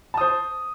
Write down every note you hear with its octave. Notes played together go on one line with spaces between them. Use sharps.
C5 A5 D#6